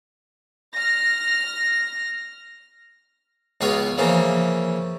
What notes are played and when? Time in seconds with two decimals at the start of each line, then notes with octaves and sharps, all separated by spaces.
0.73 F6 A#6
3.61 C#2 B2 F4 G#4 C#5 G#5
3.98 C#3 E3 F3 A#3 C#4